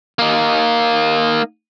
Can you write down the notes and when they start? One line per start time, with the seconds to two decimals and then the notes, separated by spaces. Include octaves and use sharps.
0.19 A#3 D#4